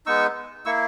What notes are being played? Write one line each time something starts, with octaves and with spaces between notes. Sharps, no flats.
G#3 B3 D#4 C#6 E6
A#3 E4 C#6 E6